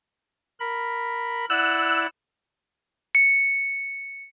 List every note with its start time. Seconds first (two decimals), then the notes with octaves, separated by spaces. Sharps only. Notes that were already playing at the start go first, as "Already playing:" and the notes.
0.60 A#4 B5
1.50 E4 D5 F#5 E6 F#6 E7
3.15 C#7